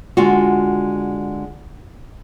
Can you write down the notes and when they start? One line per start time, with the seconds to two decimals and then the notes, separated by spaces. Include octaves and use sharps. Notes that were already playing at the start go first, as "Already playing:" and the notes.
0.17 D3 G#3 F4 F#4